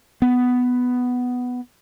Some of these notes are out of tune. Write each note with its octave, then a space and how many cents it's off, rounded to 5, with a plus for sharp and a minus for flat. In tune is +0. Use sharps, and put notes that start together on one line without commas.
B3 +5